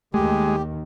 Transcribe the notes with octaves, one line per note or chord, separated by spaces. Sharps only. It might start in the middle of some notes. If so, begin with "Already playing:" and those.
D#2 D#3 G#3 A3 G4